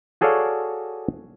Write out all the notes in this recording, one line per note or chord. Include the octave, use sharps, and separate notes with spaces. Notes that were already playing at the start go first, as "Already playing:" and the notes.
F#4 G#4 A4 C#5 D5 F5